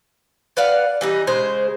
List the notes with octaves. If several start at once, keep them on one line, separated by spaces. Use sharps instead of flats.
B4 D5 F5 F#5
E3 G3 D#4
C#3 G#3 G#4 C5